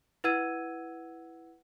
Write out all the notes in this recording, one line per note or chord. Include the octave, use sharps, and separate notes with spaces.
E4 B4 F#5 E6 G#6 D#7